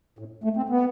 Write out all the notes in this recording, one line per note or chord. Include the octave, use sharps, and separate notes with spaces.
A2
A3
C4
B3